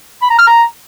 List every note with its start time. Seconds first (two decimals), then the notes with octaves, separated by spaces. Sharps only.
0.22 B5
0.30 A#5
0.39 F6
0.47 A#5